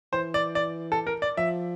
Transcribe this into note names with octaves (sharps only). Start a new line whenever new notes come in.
E3 C5
D5
D5
A4
A#4
D5
F3 E5